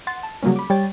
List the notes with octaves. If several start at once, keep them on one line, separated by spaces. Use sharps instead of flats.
F#5 C6 A6
A5
C#3 F#3 G3 A#3 C#4
B5 D6
G3 C#5 G5 A6